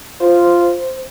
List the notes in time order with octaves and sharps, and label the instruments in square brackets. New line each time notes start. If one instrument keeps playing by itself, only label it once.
[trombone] F4 [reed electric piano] C5